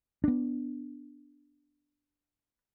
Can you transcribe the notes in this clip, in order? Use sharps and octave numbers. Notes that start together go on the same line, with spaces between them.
B3 D4